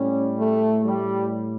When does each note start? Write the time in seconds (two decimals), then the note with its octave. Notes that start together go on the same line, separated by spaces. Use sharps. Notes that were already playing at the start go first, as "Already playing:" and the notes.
Already playing: A2 G3 C#4
0.39 A3
0.85 G3